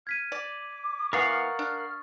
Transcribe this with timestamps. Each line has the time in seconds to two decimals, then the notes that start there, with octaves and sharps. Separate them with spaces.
0.07 F6 G#6 B6 D#7
0.32 D5 D6
1.13 E3 B3 A#4 F5 F#5 C#6 D#6 A6
1.59 D4 F6